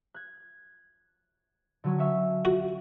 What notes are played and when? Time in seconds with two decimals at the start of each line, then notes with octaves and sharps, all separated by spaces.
0.14 F#6 G#6
1.84 D3 F#3 C#4
1.99 E5 F5 C#6
2.45 F#4